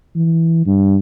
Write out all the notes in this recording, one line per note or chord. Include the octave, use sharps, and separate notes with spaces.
E3
G2